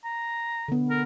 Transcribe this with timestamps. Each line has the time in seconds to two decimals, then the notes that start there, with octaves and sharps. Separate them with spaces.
0.04 A#5
0.68 D3 B3
0.90 A#4